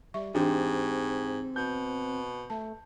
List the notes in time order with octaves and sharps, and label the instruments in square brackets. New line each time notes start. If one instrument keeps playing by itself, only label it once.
[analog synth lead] G3 [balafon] E5 C#6
[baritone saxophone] G#2 [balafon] E3 D4 [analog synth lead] C4 [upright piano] G4
[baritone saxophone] B2 [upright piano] G6
[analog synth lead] A3 [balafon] A5